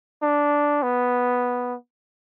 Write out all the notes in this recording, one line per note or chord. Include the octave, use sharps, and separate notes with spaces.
D4
B3